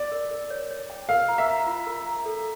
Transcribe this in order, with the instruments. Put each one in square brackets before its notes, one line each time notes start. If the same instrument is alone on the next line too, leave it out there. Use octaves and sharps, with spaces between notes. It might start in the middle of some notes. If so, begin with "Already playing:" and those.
Already playing: [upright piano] D5
[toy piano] A#4
A#4
C#5
C#5
G5
[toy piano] A#4 [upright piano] F5
[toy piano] A#5
[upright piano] E5
[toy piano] A#5
F4
A#4
A#5
A4